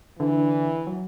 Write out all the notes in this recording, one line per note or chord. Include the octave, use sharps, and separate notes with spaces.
D3 E3
F#3